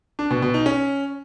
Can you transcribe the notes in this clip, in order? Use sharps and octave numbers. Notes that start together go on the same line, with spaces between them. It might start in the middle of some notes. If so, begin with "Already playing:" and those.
D4
B2
B2
D#4
C#4